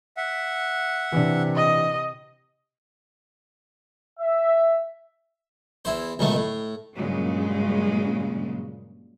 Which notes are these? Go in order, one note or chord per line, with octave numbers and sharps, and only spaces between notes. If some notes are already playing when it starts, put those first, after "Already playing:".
E5 F#5
C3 E3 D4
D#5
E5
E2 E4 C5
C#2 F#2 B2 D#3 A3
A2
G2 A#2 C#3 F#3 G#3